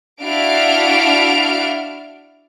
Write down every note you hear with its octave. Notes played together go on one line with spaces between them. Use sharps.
D4 E4 F#4 F5 F6 D7